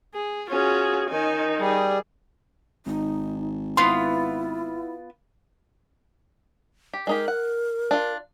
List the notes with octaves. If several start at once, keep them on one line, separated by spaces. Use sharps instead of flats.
G#4
C#4 F4 F#4 G#4
D#3 D#4 G#5
G3 G#4
G#1 D#4
B3 E4 F4 C6
G4
G#3 D#4 G4 A#4
F#5
D4 F4